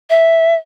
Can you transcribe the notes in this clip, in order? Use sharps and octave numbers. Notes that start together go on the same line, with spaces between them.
E5